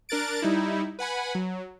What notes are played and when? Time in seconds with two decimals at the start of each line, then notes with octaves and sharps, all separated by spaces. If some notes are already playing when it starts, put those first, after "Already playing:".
0.09 D4 A#4 F#6 A6 D7
0.42 G3 D#4 E4
0.99 B4 F#5 G#5 B5
1.35 F#3